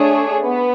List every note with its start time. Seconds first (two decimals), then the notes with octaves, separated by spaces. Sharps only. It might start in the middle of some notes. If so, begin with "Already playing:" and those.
Already playing: A3 D4 G#4 C#5
0.44 B3